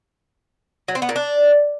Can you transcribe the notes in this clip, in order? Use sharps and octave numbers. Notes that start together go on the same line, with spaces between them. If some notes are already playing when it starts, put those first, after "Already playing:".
F#3
C4
B3
A#2
D4